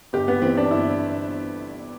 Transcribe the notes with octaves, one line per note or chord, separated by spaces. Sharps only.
G1 G4
B3
E3 C4
D4
G1 E4